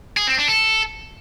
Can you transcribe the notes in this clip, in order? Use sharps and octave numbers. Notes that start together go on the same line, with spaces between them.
G#4
C4
D4
A4